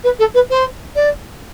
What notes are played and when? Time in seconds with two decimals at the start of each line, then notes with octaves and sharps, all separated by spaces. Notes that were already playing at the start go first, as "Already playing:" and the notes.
0.04 B4
0.19 A4
0.34 B4
0.50 C5
0.95 D5